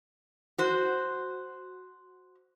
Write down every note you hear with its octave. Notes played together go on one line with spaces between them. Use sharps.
F#4 C5